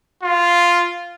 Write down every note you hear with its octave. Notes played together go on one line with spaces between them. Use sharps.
F4